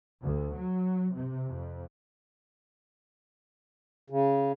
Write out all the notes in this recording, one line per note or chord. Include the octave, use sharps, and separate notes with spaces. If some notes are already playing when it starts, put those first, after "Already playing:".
D2
F#3
C3
F2
C#3